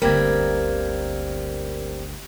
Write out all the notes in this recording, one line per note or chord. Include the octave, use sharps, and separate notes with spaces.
G1 D2 G3 A#3 C4 A#4 G#6